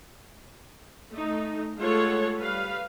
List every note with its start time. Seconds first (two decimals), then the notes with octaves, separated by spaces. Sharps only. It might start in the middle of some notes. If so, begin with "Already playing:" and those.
1.11 A3 D#4
1.77 G#3 A3 F4 A4 C#5 F#5
2.38 G3 B4 F5